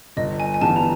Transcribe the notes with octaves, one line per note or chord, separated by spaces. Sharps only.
G1 D#5
G#5
G#5
G2 E3 G3 B3 A5
A#5